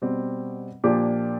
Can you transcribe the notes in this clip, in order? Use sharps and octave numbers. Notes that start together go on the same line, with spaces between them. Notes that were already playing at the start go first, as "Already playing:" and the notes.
B2 G3 C4
A#2 F3 A#3 D4 G4